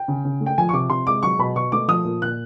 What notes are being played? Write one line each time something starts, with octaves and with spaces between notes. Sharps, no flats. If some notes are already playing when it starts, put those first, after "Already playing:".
Already playing: G5
C#3
C#3
A3
G5
F3 G#5
C#6
C3 D6
C3 C6
G#3 D6
F#3 C#6
B2 B5
B2 C#6
A3 D6
F3 D#6
A#2
A#2 F#6